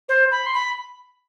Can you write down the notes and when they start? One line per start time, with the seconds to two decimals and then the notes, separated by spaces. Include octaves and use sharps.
0.08 C5
0.31 B5
0.46 C6
0.53 B5